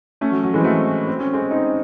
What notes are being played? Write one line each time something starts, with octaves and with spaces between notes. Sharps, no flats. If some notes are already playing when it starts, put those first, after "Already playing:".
A3 C#4
F#3
F#3
E3 G#3
C4
F#3 A3
C4
C#4
G#3 C4
C4 D#4